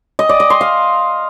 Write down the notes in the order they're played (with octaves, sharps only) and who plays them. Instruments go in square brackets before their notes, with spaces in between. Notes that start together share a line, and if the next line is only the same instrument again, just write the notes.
[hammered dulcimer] D#5
D5
D#5
C6
F5